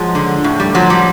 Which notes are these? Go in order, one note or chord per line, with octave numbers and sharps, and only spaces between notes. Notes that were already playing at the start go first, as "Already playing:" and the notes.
Already playing: F3 F#3 G#3
D3
A2
G3
F3 F#3
G3